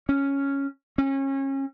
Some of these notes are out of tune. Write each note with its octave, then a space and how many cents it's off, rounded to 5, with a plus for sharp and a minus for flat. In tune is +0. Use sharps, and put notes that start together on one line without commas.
C#4 +0
C#4 -30